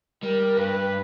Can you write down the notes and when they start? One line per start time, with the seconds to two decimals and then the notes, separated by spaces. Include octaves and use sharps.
0.23 G3 A#4
0.57 G2 B4